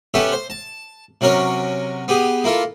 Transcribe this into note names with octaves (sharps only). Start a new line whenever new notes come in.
B3 C#4 G4 A4 B4 E5
C5
A5
C3 F#3 C#4 A#4 C#5
B3 G4 G#4
A#3 E4 F4 A4